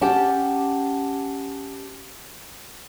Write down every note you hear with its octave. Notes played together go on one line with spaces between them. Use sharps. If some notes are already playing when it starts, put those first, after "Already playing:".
C#4 G4 F#5 G5 A5